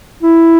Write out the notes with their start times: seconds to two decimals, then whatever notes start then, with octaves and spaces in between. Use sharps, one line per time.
0.23 E4